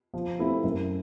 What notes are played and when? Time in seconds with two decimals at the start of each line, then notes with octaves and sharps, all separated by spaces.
0.14 F3
0.39 A3 C4 E4 G4
0.64 F#2